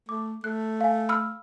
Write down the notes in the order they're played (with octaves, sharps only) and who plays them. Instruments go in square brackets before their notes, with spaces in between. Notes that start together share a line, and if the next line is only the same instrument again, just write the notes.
[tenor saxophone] A3 [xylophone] D6
[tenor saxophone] A3 [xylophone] F#6
[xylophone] F5 G#5
B5 E6 F6